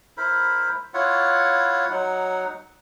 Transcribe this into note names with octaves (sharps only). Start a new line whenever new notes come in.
E4 A#4 C5 B5
E4 F4 C#5 F#5
F#3 D#4 F#5